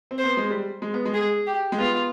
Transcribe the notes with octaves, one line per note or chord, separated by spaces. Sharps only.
C4
C5
B3
G#3
G3
G#3
B3
G#3
G#4
G4
G#3
B3 F4